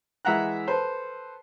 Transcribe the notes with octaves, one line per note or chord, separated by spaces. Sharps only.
E3 G#3 E5 F#5 A#5 F#6
A4 B4 C5